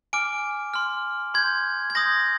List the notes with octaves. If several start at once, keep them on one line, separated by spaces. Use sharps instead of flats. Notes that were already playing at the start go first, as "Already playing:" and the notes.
G#5 D6 F6 D7
C6 F6
C6 G6 G#6
G#6
C6 D#6 G6 A#6